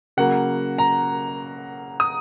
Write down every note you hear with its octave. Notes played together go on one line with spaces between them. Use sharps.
C#3 F#3 A#3 F#5
A#5
D#6